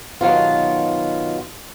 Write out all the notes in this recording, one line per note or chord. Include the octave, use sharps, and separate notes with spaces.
B2 D#3 F#3 F4